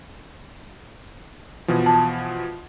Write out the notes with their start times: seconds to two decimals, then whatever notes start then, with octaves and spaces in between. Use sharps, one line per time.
1.68 B2 E3 F3
1.86 A5